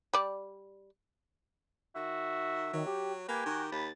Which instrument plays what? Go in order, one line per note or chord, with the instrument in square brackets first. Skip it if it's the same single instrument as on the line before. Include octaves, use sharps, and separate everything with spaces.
[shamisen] G3 D5
[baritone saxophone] D#3 [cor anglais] F#4 [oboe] E5
[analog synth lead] D#3 [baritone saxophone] F#3
[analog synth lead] G4
[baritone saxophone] A#3 [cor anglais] G4 [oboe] B4 [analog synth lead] G#5
[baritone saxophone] D#3 [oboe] F#4
[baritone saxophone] D#2 [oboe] B5 [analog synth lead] A6